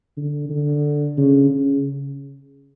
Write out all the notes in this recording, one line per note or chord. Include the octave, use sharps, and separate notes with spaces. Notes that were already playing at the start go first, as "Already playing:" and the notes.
D3
D3
C#3
C#3